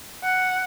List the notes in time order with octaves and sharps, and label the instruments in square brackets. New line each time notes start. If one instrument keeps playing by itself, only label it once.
[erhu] F#5